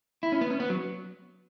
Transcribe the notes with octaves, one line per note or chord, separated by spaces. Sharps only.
E4
C#4
B3
C#4
B3
F#3